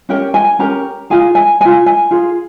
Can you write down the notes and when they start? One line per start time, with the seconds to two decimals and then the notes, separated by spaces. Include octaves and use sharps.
0.09 C#4 G4 A#4 G5
0.34 G#5
0.59 C#4 G4 A#4 A#5
1.10 F4 G#4 G#5
1.35 G#5
1.60 F4 G#4 G#5
1.86 G#5
2.11 F4 G#4